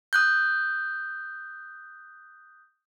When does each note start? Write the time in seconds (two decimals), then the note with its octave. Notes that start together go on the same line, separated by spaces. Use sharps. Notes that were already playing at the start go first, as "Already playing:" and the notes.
0.13 D#6 F#6 G6